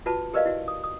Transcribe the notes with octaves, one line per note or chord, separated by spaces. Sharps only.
F4 F#4 B4 A5
G4 A#4 B4 D5 D#5 F5
E4 F#4
D#6
D#6